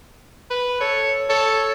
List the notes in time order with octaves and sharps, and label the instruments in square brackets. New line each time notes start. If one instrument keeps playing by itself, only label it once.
[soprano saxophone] B4
[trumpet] A4 [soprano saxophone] C#5
[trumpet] A4 [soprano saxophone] C#5